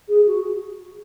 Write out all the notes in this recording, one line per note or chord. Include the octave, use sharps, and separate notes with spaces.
G#4
F#4